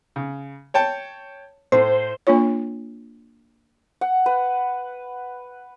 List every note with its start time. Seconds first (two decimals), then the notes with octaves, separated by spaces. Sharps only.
0.16 C#3
0.74 C#5 G5 A5
1.72 A2 C5
2.27 A#3 D4 F4 C#5
4.01 F#5
4.26 B4